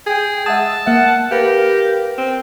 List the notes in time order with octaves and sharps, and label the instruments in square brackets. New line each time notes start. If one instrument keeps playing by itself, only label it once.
[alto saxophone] G#4 [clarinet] G5
[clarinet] G#3 [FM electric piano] E5 F#5 D#6 [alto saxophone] A5
[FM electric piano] A#3 E5 [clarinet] F#5
[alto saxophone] G4 [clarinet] A#4 [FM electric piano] B4 F5
[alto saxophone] C4